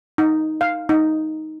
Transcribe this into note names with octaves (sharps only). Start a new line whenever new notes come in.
D#4
F5
D#4